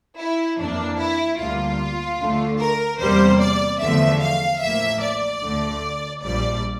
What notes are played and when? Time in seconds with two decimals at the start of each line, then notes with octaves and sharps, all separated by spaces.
0.18 E4
0.58 F2 E3 A#3 D4
0.99 E4
1.38 D2 D3 G3 A#3 F4
2.20 D2 D3 A3
2.60 A#4
3.00 E2 C3 G3 A#3 C5
3.41 D5
3.80 E2 D3 F3 A3 E5
4.21 F5
4.61 A1 A2 F3 A#3 E5
5.02 D5
5.43 D2 D3 A3
6.23 A#1 A#2 G3 D5